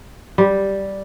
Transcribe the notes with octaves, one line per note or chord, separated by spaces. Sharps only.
G3